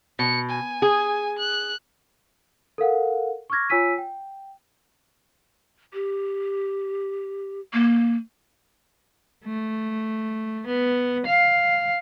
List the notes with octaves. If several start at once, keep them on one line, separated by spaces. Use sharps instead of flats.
B2 C#7
G#5
G#4
F#6
A4 A#4 F5 F#5
C#6 D6 F6 G#6 A#6
F4 C#5 G#5 E6 B6 D#7
G5
G4
A#3
A3
B3
F5